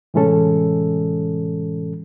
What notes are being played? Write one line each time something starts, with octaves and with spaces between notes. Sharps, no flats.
A2 C3 E3 G#3 C#4 A4